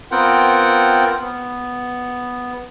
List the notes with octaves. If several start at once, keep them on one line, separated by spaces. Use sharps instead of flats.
B3 C4 F4 A#4 F#5 G5
B3